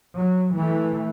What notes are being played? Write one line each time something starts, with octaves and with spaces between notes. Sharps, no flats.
F#3
E3 A3